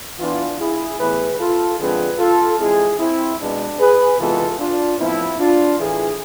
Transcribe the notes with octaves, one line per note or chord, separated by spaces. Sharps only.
E3 B3 D4 F4
E4 G#4
A2 E3 B3 G#4 B4
F4 A4
D3 F3 G#3 C4 G#4 B4
F4 A4
E3 G#3 C4 E4 G#4
C4 E4
B2 G#3 B3 D4
G#4 B4
C3 E3 G#3 B3 F4 A4
D4 F4
A2 F3 B3 C4 E4
D4 F4
A2 E3 A3 E4 G#4